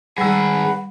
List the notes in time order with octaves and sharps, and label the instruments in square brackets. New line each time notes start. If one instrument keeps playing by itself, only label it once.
[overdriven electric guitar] D#3 G#4 [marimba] G3 E6 [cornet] B4 [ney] F#5